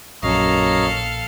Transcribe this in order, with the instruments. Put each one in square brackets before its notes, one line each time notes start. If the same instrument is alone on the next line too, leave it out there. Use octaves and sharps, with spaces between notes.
[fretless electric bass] A#1 [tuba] F#2 [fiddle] A4 F5 [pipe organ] C#5 D#5 A#5